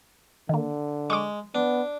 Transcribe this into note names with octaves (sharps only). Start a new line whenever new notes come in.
D3 D#3 A#3
G#3 C#6 D6
B3 D4